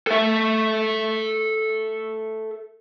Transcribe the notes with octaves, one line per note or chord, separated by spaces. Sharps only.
A4 E5